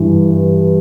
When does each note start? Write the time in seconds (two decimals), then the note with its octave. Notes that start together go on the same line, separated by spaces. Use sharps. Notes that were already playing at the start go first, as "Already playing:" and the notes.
Already playing: G2 E3